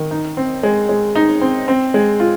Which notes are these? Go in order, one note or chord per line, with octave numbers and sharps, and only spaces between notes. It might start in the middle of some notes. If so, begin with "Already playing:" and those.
Already playing: D#3
D#4
C4
G#3
G#3
D#4
C4
C4
G#3
F4